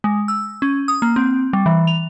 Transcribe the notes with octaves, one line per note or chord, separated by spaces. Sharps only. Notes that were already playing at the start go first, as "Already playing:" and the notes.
G#3
E6
C#4
D#6
A#3
C4
G3
E3
F7